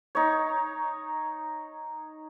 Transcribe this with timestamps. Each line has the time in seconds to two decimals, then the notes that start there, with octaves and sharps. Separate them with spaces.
0.15 D#4 C#5